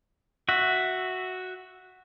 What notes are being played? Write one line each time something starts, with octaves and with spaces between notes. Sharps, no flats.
F#4 E5